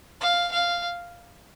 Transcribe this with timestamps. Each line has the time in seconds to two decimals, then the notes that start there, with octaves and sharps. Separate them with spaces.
0.21 F5
0.52 F5